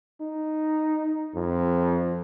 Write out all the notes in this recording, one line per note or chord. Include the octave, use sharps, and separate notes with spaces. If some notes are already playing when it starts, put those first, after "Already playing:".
D#4
F2